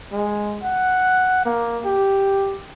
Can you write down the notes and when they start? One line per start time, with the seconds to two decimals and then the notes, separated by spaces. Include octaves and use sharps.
0.13 G#3
0.63 F#5
1.45 A#3
1.85 G4